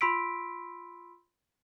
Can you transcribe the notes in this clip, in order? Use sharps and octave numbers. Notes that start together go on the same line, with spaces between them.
F4 B5 C6 E6 B6 D7